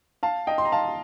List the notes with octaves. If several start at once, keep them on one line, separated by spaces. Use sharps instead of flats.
F5 A5
D#5 G5
C6
A#5
F5 A5